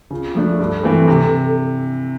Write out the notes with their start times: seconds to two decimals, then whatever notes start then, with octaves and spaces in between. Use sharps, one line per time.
0.10 C#3 F4
0.35 F3 A3 D4
0.59 G2 A4
0.83 E3 A3 C4 A4
1.08 C3